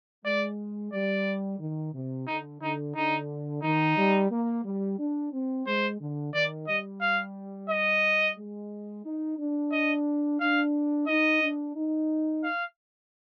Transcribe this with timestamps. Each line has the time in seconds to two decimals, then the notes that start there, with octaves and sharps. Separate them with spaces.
0.25 G#3 D5
0.93 G3 D5
1.60 D#3
1.94 C3
2.27 D3 D#4
2.61 D3 D#4
2.95 D3 D#4
3.63 D#3 D#4
3.97 G3
4.30 A#3
4.64 G3
4.98 D4
5.32 C4
5.66 G#3 C5
6.01 D3
6.33 D#3 D5
6.68 G3 D#5
7.01 F5
7.69 D#5
8.37 G#3
9.05 D#4
9.38 D4
9.72 D#5
10.40 D4 F5
11.07 D#4 D#5
11.42 D4
11.76 D#4
12.44 F5